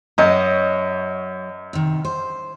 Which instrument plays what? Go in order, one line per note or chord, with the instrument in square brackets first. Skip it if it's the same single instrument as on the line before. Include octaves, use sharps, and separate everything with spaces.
[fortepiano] F#2 D#5 [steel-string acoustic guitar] F#3 C#5
[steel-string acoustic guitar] C3 D#3
C5